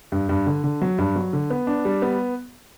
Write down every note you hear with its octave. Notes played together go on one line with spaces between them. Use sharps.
G2
G2
D3
D3
F#3
G2
F#3
D3
B3
D4
G3
B3